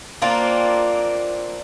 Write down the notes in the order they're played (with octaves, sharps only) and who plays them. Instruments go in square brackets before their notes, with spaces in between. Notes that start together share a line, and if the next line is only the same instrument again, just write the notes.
[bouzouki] A#3 C4 D4 F4